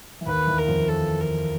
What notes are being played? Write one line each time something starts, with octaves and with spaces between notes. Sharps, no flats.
E3
D#2 D#3 B4
E2 E3
A#4
F2 F3
A4
A#4